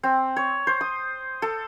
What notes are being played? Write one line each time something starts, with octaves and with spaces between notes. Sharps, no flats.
C4
C#5
C5
D#6
A4